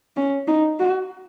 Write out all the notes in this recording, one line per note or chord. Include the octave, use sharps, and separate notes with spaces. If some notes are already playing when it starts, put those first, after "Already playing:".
C#4
D#4
F#4